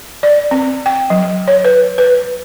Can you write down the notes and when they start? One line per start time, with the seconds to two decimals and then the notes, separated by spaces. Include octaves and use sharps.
0.23 D5
0.51 C4
0.86 G5
1.10 F#3
1.48 C#5
1.64 B4
1.98 B4